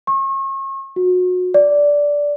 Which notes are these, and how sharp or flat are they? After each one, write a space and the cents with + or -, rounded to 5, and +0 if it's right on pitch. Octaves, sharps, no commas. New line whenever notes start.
C#6 -40
F#4 -30
D5 -10